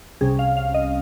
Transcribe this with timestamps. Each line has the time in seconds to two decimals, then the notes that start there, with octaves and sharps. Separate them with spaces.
0.21 C2 C3 G3 C#4 G#4
0.39 F5
0.57 F5
0.74 D#5